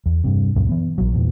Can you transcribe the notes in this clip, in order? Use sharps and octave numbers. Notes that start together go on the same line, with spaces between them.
E2
G2 C3
C#2 F#2 A#2
E3 B3
A#1 F#3
E2 A#2 E3